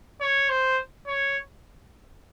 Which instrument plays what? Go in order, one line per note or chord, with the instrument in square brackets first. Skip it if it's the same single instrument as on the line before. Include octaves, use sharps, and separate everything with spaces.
[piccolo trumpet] C#5
C5
C#5